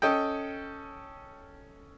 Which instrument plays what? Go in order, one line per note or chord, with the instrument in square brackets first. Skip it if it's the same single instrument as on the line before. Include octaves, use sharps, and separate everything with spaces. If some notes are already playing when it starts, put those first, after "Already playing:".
[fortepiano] C#4 A4 D#5 G5